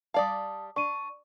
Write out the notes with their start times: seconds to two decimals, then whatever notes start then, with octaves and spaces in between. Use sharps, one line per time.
0.14 G3 D5 F5 A5 D#6
0.76 D4 C#6 D#7